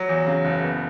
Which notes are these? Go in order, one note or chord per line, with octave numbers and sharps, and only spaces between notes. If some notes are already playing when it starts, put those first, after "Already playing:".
Already playing: F#3
E2
C#3
F#1
B3